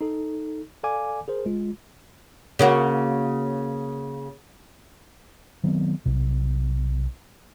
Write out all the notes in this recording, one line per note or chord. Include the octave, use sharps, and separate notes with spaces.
D#4 A4
A4 D5 F5 G#5 D6
G#4 A#4 C5
G1 G#3 F4
C#3 A#3 F#4
D#3 F#3 B3 C4
B1 C3